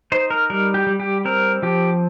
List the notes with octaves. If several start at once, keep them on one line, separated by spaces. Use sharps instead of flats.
D#4 C5
A#4
G3 A#4
G4
G3
G4
C4 A#4
F3 G4